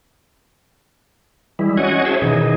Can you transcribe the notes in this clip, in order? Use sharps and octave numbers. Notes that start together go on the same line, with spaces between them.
E3 G3 G#3 E4
C#4 F#4 C#5 D#5 F#5 G#5
G#4 C5 C#5 E5 A5
B2 D#3 E3 D#4 G#4